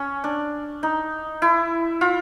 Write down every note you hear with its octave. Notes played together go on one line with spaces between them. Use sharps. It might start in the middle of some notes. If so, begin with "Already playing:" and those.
Already playing: C#4
D4
D#4
E4
F4